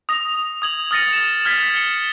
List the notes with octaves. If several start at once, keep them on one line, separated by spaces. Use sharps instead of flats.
D#6 A#6 F7
D#6 G#6 F#7
D#6 F6 A6 A#6 C#7 D#7
A6 E7
F6 G#6 B6
C#7 E7 G7